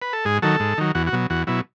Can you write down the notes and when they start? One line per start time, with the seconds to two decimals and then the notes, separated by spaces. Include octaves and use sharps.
0.02 B4
0.13 A4
0.25 G#2 G#4
0.42 D#3 F#3 A4
0.60 G#2
0.78 D#3 F#3
0.95 E2 F#4
1.07 F#4
1.12 B2 F#3
1.30 E2 F#4
1.47 B2 F#3 E4